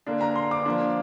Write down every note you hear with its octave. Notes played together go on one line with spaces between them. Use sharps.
D3 A#3 D4
A#5
C6
D6
F3 A#3 D4